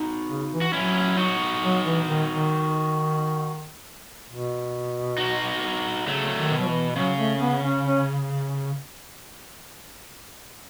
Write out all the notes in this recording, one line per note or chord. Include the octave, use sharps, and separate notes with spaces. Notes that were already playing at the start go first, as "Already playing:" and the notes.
Already playing: D#4 F#4
C#3
E3
F#4
F#3 C#4 E4
D#4 F#4
F#3
E3
D#3
D#3
B2
D#4 F#4
C#3 F#3 A3
D#3
B2
F#3
E3
C#3 F#3
A3
B3
C#4
C#4